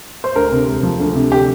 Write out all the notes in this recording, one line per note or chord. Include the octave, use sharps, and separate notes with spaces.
C5
D2 A#4
C3
E1
F3
D2
C3
D3 G4